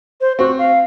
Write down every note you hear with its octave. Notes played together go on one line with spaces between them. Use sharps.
C5
C4 F#4
F5